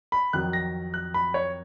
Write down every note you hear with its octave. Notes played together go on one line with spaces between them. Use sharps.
B5
F2 D#3 F#3 F#6
A#6
F#6
B5
C#5